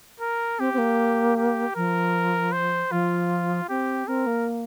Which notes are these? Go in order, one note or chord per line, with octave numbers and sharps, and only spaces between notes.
A#4
C4 G4
C4
A#3
G4
F3 A#4
C5
F3 F4
C4 G4
C4 A#4
A#3